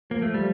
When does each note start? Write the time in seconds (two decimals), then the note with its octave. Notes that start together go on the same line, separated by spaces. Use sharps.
0.11 F3 A#3
0.22 A3
0.34 G3